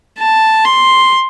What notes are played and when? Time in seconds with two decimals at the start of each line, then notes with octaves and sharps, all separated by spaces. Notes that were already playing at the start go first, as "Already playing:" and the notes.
0.19 A5
0.65 C6